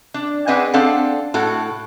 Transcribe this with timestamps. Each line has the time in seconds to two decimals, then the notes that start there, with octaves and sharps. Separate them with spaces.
0.14 D4
0.47 C4 D4 G#4 B4 D#5 F#5
0.74 C4 D4 A4 F5 F#5
1.34 A2 F#4 A4 F#5